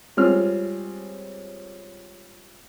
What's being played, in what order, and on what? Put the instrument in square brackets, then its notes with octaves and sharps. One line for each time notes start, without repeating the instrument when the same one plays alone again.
[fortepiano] G3 G#3 C4 C#4 F4 F6